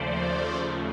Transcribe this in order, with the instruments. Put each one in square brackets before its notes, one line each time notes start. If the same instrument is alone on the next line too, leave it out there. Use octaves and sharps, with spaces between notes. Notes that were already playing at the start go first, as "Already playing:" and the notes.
Already playing: [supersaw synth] D#2 C#3 F3 A3 C5 D5